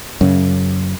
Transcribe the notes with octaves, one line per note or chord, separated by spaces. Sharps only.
F#2 C#3